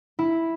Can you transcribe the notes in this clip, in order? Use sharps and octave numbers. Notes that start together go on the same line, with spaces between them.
E4